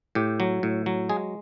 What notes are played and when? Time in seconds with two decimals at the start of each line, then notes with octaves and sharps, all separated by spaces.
0.15 A2 G4
0.40 F#3
0.63 A2
0.86 F#3
1.09 G#3 G#4